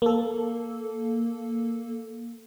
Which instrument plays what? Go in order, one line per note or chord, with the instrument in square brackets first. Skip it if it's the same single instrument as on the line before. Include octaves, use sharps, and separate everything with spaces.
[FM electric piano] A#3 A4